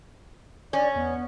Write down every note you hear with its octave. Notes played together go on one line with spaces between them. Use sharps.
C#4 D5
E2 B3